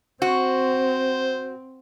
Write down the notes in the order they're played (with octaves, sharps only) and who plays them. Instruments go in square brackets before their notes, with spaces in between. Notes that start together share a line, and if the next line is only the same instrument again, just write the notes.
[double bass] C4 [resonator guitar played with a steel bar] F#4 [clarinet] C5